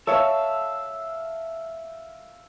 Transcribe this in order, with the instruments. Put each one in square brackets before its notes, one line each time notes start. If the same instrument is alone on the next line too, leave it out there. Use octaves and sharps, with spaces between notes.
[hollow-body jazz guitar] A4 C#5 [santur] E5 F5